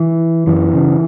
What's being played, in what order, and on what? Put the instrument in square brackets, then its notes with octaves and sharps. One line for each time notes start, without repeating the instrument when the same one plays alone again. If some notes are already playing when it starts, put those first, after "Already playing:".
Already playing: [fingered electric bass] E3
F#2 E3
C#3